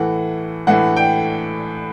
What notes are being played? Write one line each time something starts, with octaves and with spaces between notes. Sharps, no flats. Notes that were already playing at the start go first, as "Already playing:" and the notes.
Already playing: A2 E3 A3 F#5
A2 E3 A3 F#5
G5